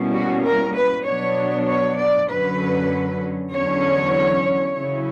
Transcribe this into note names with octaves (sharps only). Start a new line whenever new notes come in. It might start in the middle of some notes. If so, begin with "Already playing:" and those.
Already playing: B2 G3 A#3 C#4 E4
F#4
A#4
B4
B2 F#3 B3 D4 C#5
C#5
D5
F#2 D3 F#3 C#4 B4
E2 D3 F#3 C#4 C#5
C#3 F#3 C#4 E4